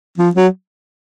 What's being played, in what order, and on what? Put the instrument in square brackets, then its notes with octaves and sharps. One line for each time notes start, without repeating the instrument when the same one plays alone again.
[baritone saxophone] F3
F#3